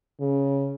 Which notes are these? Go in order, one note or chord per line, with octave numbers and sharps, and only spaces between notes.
C#3